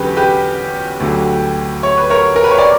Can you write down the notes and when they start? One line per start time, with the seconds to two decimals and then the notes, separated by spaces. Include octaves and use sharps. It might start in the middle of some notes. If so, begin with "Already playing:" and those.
Already playing: E2 D3 F#3 C#4 G4 B4
0.17 G4 B4
1.00 D2 D3 F#3
1.83 C#5
1.97 B4
2.10 A#4 C#5
2.36 A#4
2.44 B4
2.51 C#5
2.58 D5